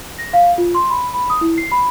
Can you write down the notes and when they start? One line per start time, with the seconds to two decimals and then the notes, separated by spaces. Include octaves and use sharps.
0.18 A#6
0.33 F5
0.58 F4
0.75 C6
0.90 B5
1.14 B5
1.30 D#6
1.41 E4
1.58 C7
1.72 B5